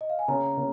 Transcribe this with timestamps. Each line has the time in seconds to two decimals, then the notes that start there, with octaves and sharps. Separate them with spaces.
0.01 D#5
0.10 F5
0.19 G#5
0.28 C#3 A#5
0.57 C#3